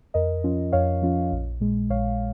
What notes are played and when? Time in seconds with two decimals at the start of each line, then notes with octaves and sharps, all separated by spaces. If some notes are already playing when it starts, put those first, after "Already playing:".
0.14 F2 A#4 D#5
0.44 F3 C#4 F4
0.72 F2 C#5 F5
1.02 F3 C#4 F4
1.32 A#1
1.60 A#2 G#3
1.90 A#1 C#5 F5